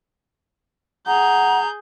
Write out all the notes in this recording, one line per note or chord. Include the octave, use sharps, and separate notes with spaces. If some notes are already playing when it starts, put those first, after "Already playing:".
G#4 F#5 A#5 G6